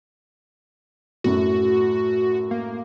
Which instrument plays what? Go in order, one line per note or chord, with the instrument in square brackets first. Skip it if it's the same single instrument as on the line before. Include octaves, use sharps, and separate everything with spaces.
[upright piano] F#2 A2 [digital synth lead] F#4
[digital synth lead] A#3